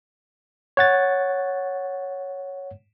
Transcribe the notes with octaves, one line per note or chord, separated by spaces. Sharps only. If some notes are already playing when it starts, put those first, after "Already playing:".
C#5 F#5 A6